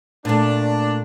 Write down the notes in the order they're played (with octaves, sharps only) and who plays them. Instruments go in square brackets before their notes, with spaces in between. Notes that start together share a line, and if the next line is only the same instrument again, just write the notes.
[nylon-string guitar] A#2 A3 [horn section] D4